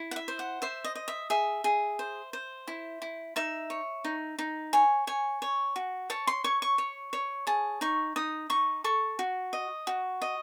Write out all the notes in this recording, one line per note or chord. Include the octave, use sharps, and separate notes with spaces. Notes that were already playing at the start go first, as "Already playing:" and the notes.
Already playing: E4
F#5
E5
C5
F#5
C5 E5
D#5
D#5
E5
G#4 E5
G#4
C5
C5
E4
E4
D#4 E5
C#5
D#4
D#4
C#5 G#5
C#5 G#5
C#5
F#4
C#5 A5
C6
C#5 C#6
C#6
C#5
C#5
G#4 A5
D#4 C#6
D#4 D#6
D#4 C#6
A4 C#6
F#4
D#5
F#4
D#5